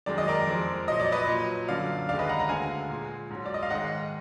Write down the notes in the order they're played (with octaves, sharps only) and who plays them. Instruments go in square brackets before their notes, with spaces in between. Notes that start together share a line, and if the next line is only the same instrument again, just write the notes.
[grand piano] F#2 D#3 G#3 D5
D#5
A#4 D5
F2 F3 G#3
A#2 F#3 D#5
D5
B4 D#5
A#2 F#3
F#2 D3 F#3 D5 F5
D#2 D3 G#3 D5 F5
B4 D#5
F#5 A#5
F#5 A#5
D2 D3 G#3 F5 G#5
A#2 G#3
G#2 F#3
D5
D#5
F5
G#2 D#3 G#3 D#5 F#5